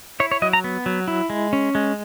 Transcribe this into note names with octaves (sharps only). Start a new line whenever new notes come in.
E4 C#5
C#5
F#3 D#5
A#5
B3
F#3
E4
G#3
C#4
G#3